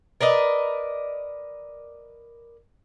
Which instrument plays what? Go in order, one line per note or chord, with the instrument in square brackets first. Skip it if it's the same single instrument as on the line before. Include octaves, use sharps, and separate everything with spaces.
[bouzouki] A#4 B4 D5 D#5